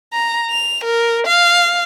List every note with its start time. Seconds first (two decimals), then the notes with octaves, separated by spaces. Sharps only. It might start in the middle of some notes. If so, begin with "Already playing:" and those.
0.13 A#5
0.50 F7
0.84 A#4
1.27 F5